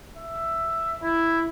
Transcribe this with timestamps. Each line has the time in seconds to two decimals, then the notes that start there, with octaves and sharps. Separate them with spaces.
0.17 E5
1.02 E4